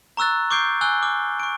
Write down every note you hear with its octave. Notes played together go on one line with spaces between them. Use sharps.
A#5 C#6 E6 F#6 A6
C#6 D6 G6 C7 D7
G#5 E6 F#6 G7
D6 F6
C#6 D7